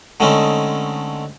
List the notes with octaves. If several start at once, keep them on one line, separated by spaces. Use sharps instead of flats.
D3 G#3 A3 C4 C#4 D#4